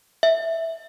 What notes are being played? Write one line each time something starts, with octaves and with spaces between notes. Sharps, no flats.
E5